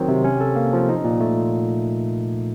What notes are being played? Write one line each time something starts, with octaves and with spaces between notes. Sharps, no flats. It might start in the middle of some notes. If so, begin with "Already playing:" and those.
Already playing: D#3 F#3 C4
C3
C#4
A4
A#3
F3
D#4
A#2
A3